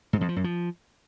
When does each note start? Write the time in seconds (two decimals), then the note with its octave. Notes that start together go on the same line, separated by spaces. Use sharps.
0.13 G#2
0.21 F2
0.29 F3
0.36 F#2
0.44 F3